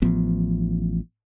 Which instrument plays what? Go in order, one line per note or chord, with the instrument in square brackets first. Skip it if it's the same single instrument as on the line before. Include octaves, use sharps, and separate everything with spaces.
[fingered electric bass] A1 F3 B3